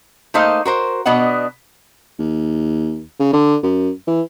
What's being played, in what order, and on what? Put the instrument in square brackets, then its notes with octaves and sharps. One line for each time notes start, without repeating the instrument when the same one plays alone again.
[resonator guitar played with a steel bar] A3 A#3 D#4 C5 D#5 F5
F#4 A#4 C5
B2 B3 D4 D#5 F#5
[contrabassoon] D#2
C#3
D3
F#2
E3